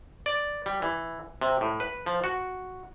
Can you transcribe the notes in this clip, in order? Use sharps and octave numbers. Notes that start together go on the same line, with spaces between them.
D5
G3
E3
C3
A2
B4
F3
F#4